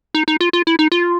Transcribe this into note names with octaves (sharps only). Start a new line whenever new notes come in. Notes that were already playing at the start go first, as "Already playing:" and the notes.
D#4
D#4
F4
F4
E4
D#4
F4